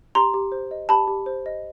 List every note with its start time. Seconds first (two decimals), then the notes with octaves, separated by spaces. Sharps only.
0.15 G4 A#5 C6
0.34 G4
0.52 C5
0.71 D#5
0.89 G4 A5 B5
1.08 G4
1.26 C5
1.46 D#5